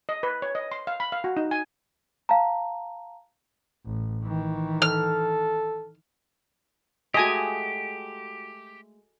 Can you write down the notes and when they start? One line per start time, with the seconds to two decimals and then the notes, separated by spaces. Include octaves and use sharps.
0.09 D#5
0.23 B4
0.42 C#5
0.55 D#5
0.72 C6
0.87 F5
1.00 B5
1.12 F5
1.24 F#4
1.37 D#4
1.51 G#5
2.29 F5 A5 A#5
3.86 A1
4.23 D#3 E3
4.82 A4 F6
7.14 G#3 A3 F#4 G4 D#5 G#5